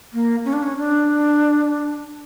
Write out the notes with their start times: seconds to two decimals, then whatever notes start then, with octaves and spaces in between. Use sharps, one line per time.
0.13 A#3
0.45 C#4
0.53 D4
0.62 C#4
0.78 D4